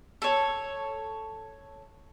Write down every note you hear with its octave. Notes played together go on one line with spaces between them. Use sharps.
A4 C#5